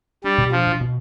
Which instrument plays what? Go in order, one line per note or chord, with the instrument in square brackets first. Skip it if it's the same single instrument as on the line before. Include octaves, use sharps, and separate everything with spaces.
[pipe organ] G3 [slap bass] D4
[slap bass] B2
[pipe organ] F3 [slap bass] D4
[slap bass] B2
B2